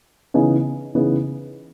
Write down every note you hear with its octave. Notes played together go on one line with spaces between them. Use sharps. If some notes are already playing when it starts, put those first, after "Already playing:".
C#3 E3 B3 D#4 G#4
C#3 E3 B3 D#4 G#4